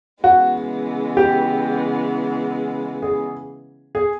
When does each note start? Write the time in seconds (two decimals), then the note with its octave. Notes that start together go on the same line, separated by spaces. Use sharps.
0.24 C#3 E3 G#3 B3 F#4
1.17 G4
3.02 G#4
3.95 G#4